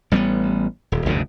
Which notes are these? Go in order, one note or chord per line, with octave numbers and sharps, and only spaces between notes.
A1 G3 A#3 B3
D#1
F1 D2 G2 C#3